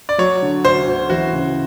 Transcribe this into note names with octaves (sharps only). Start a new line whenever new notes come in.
D5
F#3 C#5
D3
D2 C5
D2
E3 F#4
C#3